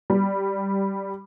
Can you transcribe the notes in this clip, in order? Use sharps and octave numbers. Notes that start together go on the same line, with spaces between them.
G3